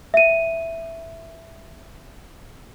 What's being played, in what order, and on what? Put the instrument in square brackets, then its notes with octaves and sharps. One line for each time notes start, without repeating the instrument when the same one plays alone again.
[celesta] E5 D#7